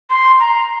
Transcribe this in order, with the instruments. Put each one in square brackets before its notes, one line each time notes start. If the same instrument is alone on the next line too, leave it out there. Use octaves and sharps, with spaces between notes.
[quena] C6
A#5